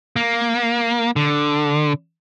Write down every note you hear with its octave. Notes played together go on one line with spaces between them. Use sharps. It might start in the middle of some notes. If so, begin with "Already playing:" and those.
A#3
D3